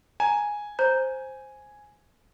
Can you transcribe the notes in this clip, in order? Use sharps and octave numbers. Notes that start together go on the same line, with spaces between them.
G#5 A#5
C5 A#5 G6